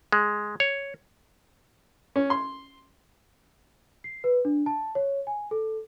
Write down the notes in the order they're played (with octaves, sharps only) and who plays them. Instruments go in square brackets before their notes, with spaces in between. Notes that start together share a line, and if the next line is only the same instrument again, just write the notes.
[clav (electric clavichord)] G#3
C#5
[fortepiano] C#4
C6
[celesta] C7
B4
D4
A5
C#5
G#5
A4